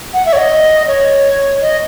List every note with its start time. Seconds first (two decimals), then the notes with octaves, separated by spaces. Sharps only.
0.14 F#5
0.26 E5
0.33 C#5
0.38 D#5
0.88 C#5
1.62 D#5